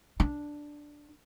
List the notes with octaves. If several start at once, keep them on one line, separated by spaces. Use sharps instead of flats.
D4